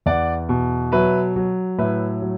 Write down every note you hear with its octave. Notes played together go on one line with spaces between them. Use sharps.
E2 D5 F#5
B2
F#3 B4 E5
F#3
A2 B4 E5
F#3